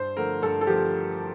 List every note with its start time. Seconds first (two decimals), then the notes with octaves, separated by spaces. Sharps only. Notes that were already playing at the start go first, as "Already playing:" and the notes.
Already playing: G2 C5
0.17 D3 F3 A3 A#4
0.42 G2 A4
0.61 A4
0.67 D3 F3 A3 G4